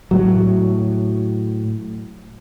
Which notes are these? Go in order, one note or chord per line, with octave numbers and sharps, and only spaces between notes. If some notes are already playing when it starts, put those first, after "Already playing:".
A2 F#3